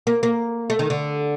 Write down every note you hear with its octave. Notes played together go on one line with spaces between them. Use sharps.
A#3
A#3
A3
D#3
D3